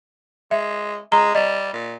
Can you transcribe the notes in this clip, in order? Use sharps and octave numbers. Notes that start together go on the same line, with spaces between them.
G#3 E5
G#3 A#5
G3 D#5
A#2